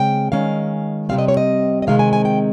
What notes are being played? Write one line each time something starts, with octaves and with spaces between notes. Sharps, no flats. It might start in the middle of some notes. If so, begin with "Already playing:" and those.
Already playing: C#3 G#3 C4 G5
D#3 G#3 C#4 F5
C3 G3 C4 F5
D#5
C#5
D#5
D#5
C3 D#3 G#3 C4 F5
G#5
G#5
G5